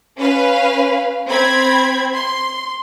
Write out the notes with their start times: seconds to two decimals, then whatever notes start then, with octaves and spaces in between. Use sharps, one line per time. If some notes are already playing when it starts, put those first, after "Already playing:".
0.17 C#4 B4 F5
1.28 C4 B5 G#6
2.13 C6